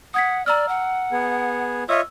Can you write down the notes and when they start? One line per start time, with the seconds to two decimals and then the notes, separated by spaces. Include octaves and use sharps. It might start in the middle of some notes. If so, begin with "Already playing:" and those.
0.14 F#5 D#6 G#6 B6
0.46 D5 A#5 E6 F6
0.69 F#5
1.12 B3 G#4
1.89 F4 C#5 D#5 E5 E6